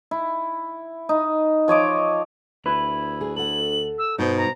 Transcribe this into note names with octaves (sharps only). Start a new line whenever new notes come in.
E4
D#4
F3 C#5 D#5 D6
D2 E4 B4
G#4
A4 F#5 F#7
E6
G2 B2 D#4 C5 G6
A#5